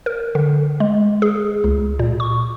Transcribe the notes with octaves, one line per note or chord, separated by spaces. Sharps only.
A#4
D3
G#3
G#4
C#2
A#2
C#6